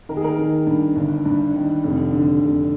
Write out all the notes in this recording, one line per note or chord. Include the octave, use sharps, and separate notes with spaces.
D#3 A#4
G#4
A#4
D#3
G2
G1
G2
D#3
F1
D3
F1